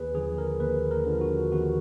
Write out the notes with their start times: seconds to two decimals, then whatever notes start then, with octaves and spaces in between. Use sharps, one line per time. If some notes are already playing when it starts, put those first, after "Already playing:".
Already playing: D#2 G#4 B4
0.15 D3 F3 G#4
0.38 A#4
0.60 D#2 B4
0.91 A#4
1.06 D3 F3
1.21 F#4
1.51 D#2 F#4